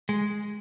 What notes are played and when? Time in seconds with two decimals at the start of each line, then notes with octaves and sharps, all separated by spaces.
0.09 G#3